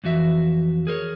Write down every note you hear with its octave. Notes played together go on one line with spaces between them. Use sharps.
F2 E3 F#4 E5
G#4 A#4 C5 C#5